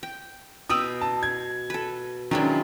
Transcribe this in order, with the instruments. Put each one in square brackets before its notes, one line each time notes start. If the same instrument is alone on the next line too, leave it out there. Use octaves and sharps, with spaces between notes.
[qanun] G5
[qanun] B2 B4 G5 [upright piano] D#6 E6
[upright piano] A5
G#6
[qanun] A4 B4
[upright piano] D#3 C#4 D4 [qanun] F#3 G#3 E4